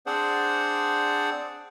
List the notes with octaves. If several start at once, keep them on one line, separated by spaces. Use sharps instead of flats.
C4 D4 G#4 C5 D5 F#5